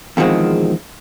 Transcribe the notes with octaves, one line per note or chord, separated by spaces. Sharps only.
E2 B2 D#3 F3 G#3 C4